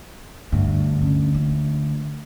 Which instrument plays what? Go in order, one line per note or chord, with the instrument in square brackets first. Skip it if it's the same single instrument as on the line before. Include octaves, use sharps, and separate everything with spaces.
[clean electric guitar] D2 [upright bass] G2
[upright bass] D3 C#4
A#3 F4